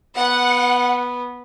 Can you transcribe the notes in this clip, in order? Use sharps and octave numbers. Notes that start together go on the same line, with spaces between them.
B3 F#5